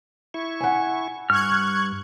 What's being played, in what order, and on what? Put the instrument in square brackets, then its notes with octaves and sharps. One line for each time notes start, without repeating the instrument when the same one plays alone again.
[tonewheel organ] E4 C#6
[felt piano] F#5 G#5
[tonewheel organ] G2 [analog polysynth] C#6 F#6 G#6 [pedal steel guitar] F6